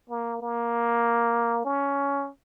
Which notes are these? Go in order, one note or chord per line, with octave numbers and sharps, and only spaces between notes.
A#3
A#3
C#4